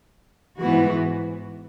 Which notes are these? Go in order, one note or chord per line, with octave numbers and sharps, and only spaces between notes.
G#2 E3 B3 F#4